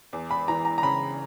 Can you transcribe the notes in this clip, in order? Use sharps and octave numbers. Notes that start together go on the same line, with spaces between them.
E2
B5
E3 A#5
A#5
A#5
C#3 B5